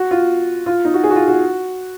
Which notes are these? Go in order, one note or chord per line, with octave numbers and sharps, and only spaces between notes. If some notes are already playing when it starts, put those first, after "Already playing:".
Already playing: F#4
F4
F4
D#4
F#4
G#4
F#4
F4
F#4